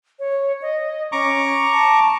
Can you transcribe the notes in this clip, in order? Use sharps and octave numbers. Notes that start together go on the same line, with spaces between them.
C#5
D#5
C#4 A#5 C#6 D6
A5